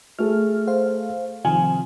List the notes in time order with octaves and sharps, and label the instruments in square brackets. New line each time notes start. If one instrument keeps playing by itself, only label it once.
[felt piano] A3 G#4 A4 [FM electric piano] F6
[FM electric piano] C5 F5
[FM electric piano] C3 D#3 F3 [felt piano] G#5